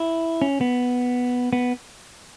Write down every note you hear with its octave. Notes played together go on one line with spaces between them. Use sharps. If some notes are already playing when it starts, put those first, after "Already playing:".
Already playing: E4
C#4
B3
B3